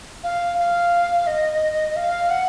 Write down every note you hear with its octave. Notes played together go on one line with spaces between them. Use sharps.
F5
F5
D#5
F5
F#5